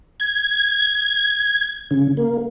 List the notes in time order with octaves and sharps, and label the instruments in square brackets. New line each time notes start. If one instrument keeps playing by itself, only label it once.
[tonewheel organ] G#6
C#3
A#3